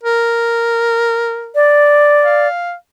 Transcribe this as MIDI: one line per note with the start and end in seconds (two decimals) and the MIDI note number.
0.03 1.55 70
1.55 2.48 74
2.23 2.73 77